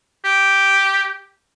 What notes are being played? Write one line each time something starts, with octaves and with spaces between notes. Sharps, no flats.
G4